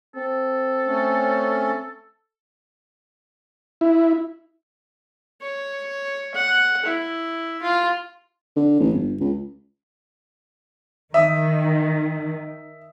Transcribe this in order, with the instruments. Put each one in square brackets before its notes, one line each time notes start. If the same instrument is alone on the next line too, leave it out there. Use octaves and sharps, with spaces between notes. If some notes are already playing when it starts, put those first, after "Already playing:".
[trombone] C4 [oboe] A4
[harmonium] A3 C#4
[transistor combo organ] E4
[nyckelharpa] C#5
F#5
E4
F4
[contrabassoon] D3
A1
G1
C#2
[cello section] D#3 [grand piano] E5 D#6